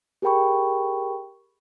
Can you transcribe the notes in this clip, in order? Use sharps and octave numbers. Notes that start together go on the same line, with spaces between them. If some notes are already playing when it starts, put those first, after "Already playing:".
G4 G#4 A#4 G5 B5 C#6